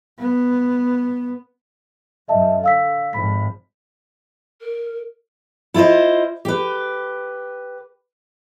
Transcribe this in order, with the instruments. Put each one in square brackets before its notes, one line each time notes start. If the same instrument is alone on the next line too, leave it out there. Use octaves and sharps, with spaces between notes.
[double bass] B3
[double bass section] F#2 [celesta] D#5 E5 A5
[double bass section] D3 [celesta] F5 E6 B6
[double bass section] G#1 G#2 F3 [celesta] B5 B6
[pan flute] A#4
[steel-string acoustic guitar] E4 F4 A4 C5 D#5
G4 B4